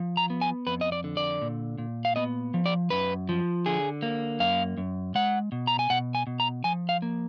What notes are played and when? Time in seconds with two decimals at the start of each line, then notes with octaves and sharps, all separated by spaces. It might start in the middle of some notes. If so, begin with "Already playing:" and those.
Already playing: F3
0.17 A#5
0.30 B3
0.41 G#5
0.67 F2 B4
0.81 D#5
0.92 D5
1.04 D3
1.17 D5
1.42 A#2
1.78 A#2
2.05 F5
2.16 B3 D#5
2.54 F3
2.66 D5
2.90 F#2 B4
3.29 F3
3.66 D3 G#4
4.02 A#3
4.40 F#2 F5
4.78 F#2
5.15 G#3 F#5
5.52 B2
5.67 A#5
5.79 G#5
5.90 B2 F#5
6.15 G#5
6.27 B2
6.40 A#5
6.64 F3 G#5
6.89 F5
7.02 A#3